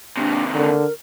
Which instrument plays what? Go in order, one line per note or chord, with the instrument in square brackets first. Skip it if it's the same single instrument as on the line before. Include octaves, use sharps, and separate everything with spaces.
[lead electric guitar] D#2 C3 [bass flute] D4
[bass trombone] D3 [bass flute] A#4